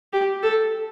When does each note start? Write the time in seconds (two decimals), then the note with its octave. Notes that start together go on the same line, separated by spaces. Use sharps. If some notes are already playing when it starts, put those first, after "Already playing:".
0.13 G4
0.43 A4